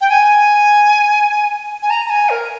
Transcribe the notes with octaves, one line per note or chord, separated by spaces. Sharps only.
G5
G#5
G#5
A#5
A#5
G#5
A#4